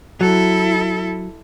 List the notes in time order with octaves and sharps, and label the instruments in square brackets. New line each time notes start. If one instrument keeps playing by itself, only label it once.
[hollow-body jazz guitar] F#3 [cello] E4 A4